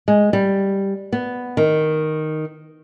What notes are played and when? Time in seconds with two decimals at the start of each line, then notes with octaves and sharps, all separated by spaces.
0.08 G#3
0.33 G3
1.13 B3
1.57 D#3